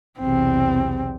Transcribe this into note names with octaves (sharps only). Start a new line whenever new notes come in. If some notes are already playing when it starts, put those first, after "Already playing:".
B1 E2 C3 C4